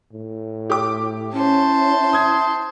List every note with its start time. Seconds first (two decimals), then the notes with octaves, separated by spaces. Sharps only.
0.13 A2
0.70 G4 D6
1.33 C#4 E4 C5 A5
2.13 D#6 G#6